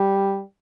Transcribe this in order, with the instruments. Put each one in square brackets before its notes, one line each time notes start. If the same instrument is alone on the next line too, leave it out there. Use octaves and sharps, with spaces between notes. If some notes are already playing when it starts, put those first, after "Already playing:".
Already playing: [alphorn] G3